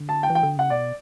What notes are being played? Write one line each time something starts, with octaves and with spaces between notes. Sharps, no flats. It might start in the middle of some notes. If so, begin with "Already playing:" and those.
Already playing: D3
A5
G5
E3
G5
D3
C#3 F#5
B2 D5